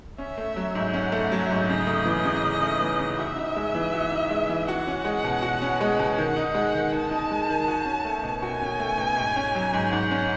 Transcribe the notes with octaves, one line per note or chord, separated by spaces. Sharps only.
C#4 E5
A3
F#3
G#2
C#4 F#5
A3
F#3 E5
G#2
C#3 D#5
A3
E3
C#3
C#3
A3
E3
C#3
F#4 E5
D#4
G#3
E3
F#4
D#4
G#3
E3
F#4 F#5
C#4
G#3
B2
F#4
C#4
G#3
B2
D#3 F#5
D#4
G#3 F#5
D#3
D#3 A5
D#4
G#3
D#3
F#4
C#4
A3
B2
F#4 G#5
C#4
A3
B2
G#2
C#4
F#3
G#2
G#2 F#5
C#4